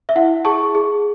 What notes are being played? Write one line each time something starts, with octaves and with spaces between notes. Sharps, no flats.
E5
E4 F#5
G#4 A5 C#6
G#4